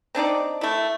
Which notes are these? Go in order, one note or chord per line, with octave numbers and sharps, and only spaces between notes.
C4 D4 D#4 D5
A3 E4